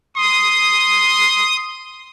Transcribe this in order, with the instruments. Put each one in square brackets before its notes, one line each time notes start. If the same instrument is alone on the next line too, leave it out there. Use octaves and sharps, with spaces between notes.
[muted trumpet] C6 [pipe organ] D#6